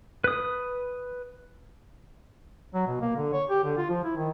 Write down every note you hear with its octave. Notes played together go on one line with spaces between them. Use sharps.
B4 D#6
F#3
B2
A#3
D3
C#5
G4
D3
F4
F3
E4
D#3